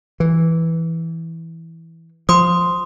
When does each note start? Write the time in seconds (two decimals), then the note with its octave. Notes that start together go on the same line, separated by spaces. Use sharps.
0.20 E3
2.29 F3 C6 D#6